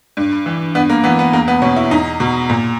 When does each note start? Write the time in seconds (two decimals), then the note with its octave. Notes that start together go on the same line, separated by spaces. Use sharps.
0.17 G2
0.46 E3
0.75 G2 B3
0.90 A#3
1.04 E3 B3
1.19 B3
1.33 E2 A#3
1.48 B3
1.62 B2 C#4
1.76 E4
1.91 E2 D#4
2.20 B2
2.50 A#2